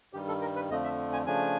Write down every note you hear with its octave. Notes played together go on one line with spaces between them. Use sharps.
G2 D#3 G3 G4
A4
A#4
B4
F2 D3 F3 A3 D#5
E5
G#5
C#3 F3 A3 D4 G#5